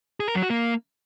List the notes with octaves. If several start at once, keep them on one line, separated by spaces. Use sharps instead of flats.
G#4
A#4
F#3
F#4
A#3